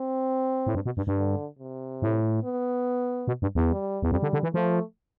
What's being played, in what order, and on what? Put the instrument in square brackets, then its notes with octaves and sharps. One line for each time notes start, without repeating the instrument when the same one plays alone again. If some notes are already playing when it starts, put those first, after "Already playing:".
Already playing: [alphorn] C4
[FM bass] A2
G2
B2
G2
G2
[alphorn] D3
C3
[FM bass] A2
[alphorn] B3
[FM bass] B2
G2
E2
[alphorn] G3
[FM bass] E2
[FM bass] F2 [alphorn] G3
[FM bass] D3
D3
E3
[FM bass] F3 [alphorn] A3